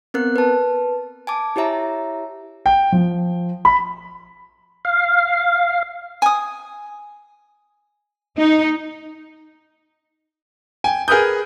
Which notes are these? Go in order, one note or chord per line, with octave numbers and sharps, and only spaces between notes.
B3 C4 A#4 F#6
B4 A5
G#5 A5 D6
E4 G4 C#5 E5 A#5
G5
F3
B5
F5
G#5 D#6
D#4
G5 G#5
G#4 A#4 B4 D#6 G6